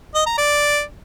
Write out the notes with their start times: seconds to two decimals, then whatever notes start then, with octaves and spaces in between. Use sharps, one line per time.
0.15 D#5
0.26 A#5
0.38 D5